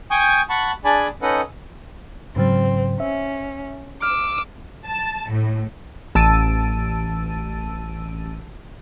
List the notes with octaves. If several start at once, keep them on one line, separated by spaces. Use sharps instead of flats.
G5 G#5 C#6 D#6 G6
F#5 A5 B5 C#6
D4 G#4 D5 G#5 A5 B5
C#4 D#4 A4 B4 D#5 F#5
G#2 C#3 F#3 C4
C#4 E5
D6 E6 F6
A5
A2
A1 A5 E6 A6 D7 D#7